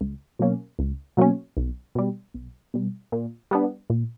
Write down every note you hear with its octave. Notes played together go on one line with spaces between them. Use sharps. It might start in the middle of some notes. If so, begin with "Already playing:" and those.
C#2
B2 F#3 A#3 C#4
C#2
B2 F#3 A#3 C#4
B1
B2 G3
B1
B2 G3
A#2
G3 B3 D4
A#2